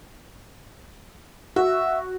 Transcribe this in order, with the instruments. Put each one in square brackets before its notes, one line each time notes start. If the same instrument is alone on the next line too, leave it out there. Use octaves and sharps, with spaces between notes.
[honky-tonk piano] F#4 [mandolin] E5